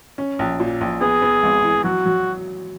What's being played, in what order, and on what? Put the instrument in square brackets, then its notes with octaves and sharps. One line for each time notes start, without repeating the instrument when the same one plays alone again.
[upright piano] C#4
A#1
A#2
A#1
[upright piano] B3 [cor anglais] G#4
[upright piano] B3
G#1
E3
[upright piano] F#3 [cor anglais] F#4
[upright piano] F#3